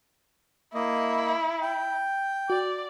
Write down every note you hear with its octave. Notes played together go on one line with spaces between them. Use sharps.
A#3 E4 D#5
G5
F#4 D5